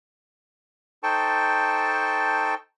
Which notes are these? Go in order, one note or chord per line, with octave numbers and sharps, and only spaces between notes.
D#4 A4 C5 G5 A5 C#6